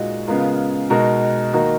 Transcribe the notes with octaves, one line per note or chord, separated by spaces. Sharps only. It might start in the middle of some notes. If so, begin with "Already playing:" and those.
Already playing: A#2 G#3 D#4 F#4
C#3 G#3 B3 F4 A#4
B2 G#3 D#4 F#4 A#4
D#3 A#3 D#4 F#4 A#4